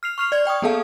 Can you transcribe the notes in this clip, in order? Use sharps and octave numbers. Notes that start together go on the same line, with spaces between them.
F6 C7 F7
C#6 F6 F7
D5 G#6 F7
D5 G5 C#6 D#6
A#3 B3 G#4 A4 F5 A5